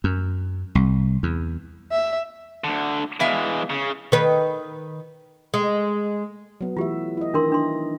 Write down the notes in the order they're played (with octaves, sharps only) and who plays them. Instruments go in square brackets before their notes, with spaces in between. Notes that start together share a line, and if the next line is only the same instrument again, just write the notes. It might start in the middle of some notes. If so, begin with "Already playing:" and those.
[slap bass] F#2
C2
E2
[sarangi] E5
[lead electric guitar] D2 D3
[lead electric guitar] E3 G#3 [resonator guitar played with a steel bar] B3 E5 F5
[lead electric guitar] C#3
[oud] D#3 B4
G#3
[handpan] F#3 B3
[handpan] E3 A3 E5 [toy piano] F4 G4
[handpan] E4 D#5
[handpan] D#3 E3 D#4 [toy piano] D4 A#4 C6
[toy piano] D4 C6